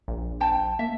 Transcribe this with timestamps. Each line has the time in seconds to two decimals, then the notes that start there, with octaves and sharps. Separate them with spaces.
0.08 A#1
0.40 C5 G5 A5
0.79 A#3 E5